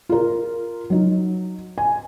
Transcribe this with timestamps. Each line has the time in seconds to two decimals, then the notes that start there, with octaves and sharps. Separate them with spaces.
0.09 F4 A#4
0.90 F#3 D#4
1.78 G#5